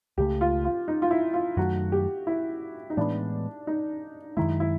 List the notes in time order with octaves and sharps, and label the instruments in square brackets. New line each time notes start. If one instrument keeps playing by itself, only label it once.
[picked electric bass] C#2 C#3 F3 A3 [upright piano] G4
[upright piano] F4
F4
D#4
F4
E4
F4
[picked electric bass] F#2 D#3 F#3 A3 [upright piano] F#4
[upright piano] G4
E4
D#4
[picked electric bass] A2 E3 G#3 B3 [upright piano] D4
[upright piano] D#4
[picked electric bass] F#2 D#3 G#3 [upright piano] E4
[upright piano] E4